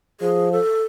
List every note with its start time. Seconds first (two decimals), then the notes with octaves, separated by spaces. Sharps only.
0.21 F3 G#4
0.52 A4